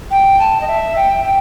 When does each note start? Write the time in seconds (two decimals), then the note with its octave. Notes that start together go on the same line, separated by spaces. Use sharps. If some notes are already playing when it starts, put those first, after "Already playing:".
0.11 G5
0.39 A5
0.61 D#5
0.68 E5
0.96 G5
1.24 G5